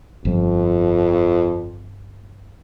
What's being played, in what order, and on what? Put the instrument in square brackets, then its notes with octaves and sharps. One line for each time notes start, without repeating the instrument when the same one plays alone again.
[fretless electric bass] G1 F3 [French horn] F2